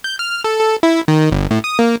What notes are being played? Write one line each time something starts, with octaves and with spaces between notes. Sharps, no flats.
G6
F6
A4
A4
E4
D#3
G1
A2
D#6
A#3